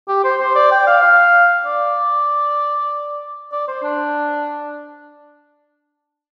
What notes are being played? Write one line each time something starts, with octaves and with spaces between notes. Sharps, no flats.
G4
C5
C5
D5
G5
F5
F5
D5
D5
C5
D4